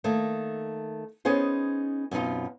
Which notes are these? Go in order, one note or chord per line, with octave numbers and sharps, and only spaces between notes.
D#3 A3 A#3
B3 C#4 D#4 G#4 C5
F#2 B2 C4 D#4 F4